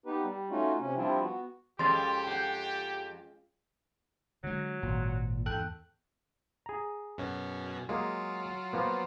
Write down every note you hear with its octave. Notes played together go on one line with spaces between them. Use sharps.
B3 D#4 G4 B4
G3
A3 C#4 D#4 F4 F#4
C3 C#4
F3 G3 C4 D4 E4 F4
B3 F#4
F2 G#3 C#4 G4 C6 A6
F#5 G5 G6
D3 F#3 G#3
G#1 A#2
E2 G#2 A4 G5 F#6
G#4 A#5
F#2 B2 C#4
F#3 G#3 A#3 F4 G#4
F3 A#3 B3